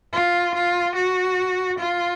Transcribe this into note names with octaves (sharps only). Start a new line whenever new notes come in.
F4
F4
F#4
F4